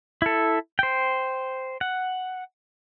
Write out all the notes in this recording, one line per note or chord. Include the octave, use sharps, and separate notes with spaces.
E4 A4
C5 G5
F#5